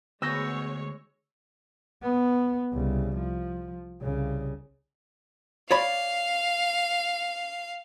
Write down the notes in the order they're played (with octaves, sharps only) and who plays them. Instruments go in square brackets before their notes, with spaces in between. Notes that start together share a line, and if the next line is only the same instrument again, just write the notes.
[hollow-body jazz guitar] D2 [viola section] G#3 C#5 [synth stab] B3 [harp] E6 G6 A#6
[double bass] B3
C2 C#3
F3
C2 C#3
[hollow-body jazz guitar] C#5 D5 B5 [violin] F5